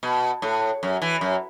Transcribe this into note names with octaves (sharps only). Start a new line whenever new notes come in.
B2
A2
F#2
E3
F#2